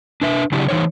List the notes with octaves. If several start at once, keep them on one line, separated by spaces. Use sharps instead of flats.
D4 B4 E5
C#3 F#3 D4 E4 G4
E3 G#3 D#4 C5 C#5